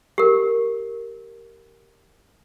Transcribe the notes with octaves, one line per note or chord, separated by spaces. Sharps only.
G4 A#4